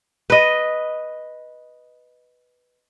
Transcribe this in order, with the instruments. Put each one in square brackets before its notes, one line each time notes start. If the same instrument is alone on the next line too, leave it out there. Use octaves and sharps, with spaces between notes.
[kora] B4 D#5